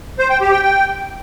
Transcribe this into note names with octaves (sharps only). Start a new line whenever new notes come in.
C5
G5
G4
G5
G5